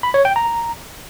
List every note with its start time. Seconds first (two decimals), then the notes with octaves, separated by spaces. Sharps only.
0.03 B5
0.14 C#5
0.25 G5
0.36 A#5